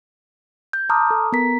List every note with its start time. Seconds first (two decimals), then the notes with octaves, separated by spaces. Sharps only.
0.73 G6
0.89 A5 A#5 C6 D6 D#6 F6
1.10 A4
1.32 B3 A#4 A#5 B6